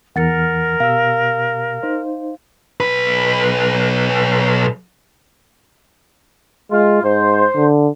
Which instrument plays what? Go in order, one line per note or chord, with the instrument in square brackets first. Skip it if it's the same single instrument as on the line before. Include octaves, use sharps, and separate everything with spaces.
[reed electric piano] E2 E3 F6 [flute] A#4 [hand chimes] F#5 A6 C#7
[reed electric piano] B2 G4 E6 [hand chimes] F5
[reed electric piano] D#4 C5
[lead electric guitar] B1 B4
[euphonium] G#3 [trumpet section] F4
[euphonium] G#2 [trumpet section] C5
[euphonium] D3